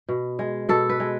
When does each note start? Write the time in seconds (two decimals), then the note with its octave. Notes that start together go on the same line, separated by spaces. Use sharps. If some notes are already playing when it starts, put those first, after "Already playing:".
0.09 B2
0.39 G#3
0.69 B2 A4
0.89 B4
1.00 G#3